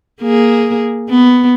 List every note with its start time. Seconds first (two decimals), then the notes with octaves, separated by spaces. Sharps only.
0.22 A#3 G#4
1.09 B3